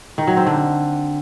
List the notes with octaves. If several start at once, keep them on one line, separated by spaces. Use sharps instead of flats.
D#3
F#3
C4
D3